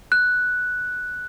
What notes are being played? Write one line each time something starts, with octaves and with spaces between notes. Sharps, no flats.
F#6